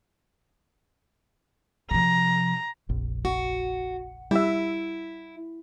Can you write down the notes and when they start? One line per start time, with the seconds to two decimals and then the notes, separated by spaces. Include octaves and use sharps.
1.91 C3 F3 A#5
2.89 F1 A#1
3.25 F#4
4.31 G3 E4 E5